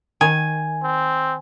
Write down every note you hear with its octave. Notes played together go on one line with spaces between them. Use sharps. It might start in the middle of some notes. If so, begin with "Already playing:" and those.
D#3 G#5
C4